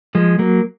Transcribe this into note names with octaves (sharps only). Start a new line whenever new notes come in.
F3 G#3
F#3 A#3